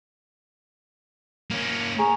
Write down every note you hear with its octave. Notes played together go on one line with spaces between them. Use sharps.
A#3 C#4
G#4 A#5 C#6